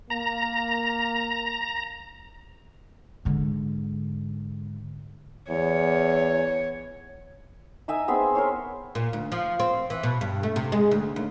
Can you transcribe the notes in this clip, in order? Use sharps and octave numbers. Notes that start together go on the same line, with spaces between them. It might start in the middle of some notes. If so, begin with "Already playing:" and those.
A#3 A#5
G#2 D3
E2 C#5
D#4 E5 G#5 D#6
B3 C4 G#4 E5
A#4 C5 C#5
A#2
D2
F3
C4
E3
B2
G2
A3
C3
G#3
D2
D#2